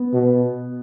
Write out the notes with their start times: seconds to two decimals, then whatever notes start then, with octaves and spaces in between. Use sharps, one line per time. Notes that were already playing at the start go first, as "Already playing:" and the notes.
Already playing: B3
0.13 B2